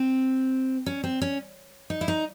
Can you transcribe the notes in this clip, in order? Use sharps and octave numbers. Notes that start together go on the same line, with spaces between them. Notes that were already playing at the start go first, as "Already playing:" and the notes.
Already playing: C4
C#4
C4
C#4
D#4
E4
D#4